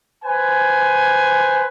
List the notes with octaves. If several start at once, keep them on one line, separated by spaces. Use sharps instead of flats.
B4 C5 G#5